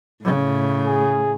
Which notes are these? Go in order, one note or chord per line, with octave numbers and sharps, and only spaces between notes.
A2 C#3
G#4